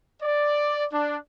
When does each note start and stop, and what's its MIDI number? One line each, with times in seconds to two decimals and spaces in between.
0.22 0.84 74
0.92 1.16 62